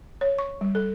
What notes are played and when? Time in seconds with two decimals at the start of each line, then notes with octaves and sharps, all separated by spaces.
0.21 C#5
0.38 C#6
0.61 G3
0.75 A4